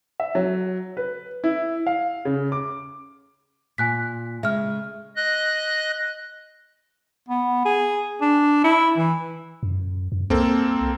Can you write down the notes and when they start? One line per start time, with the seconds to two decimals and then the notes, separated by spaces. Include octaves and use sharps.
0.20 E5
0.35 F#3
0.97 B4
1.44 E4
1.86 F5
2.25 C#3
2.52 D6
3.78 A#2 G#5 F#6 B6
4.43 C#3 G#3 E5 F6
5.16 D#5 F#6
7.28 B3
7.65 G#4
8.21 D4
8.64 E4
8.97 E3
9.63 F#2
10.12 F#2
10.30 C2 A#3 C4 A4